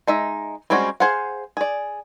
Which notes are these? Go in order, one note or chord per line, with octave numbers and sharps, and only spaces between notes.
G#3 D#4 E5
G3 G#3 C4 C#4 F#4
G#4 C5 F5 F#5
G#4 D5